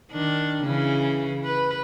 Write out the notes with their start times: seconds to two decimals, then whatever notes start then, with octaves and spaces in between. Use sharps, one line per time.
0.11 D#3 D4
0.63 C#3 E3
1.44 B4